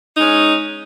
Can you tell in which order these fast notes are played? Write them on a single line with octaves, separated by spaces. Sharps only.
D#4 G#3 C#4